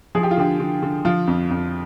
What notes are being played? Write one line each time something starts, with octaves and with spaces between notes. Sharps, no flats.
F3 G#4
G4
F4
D3 G4
D3
D3
F3 F4
F2
F2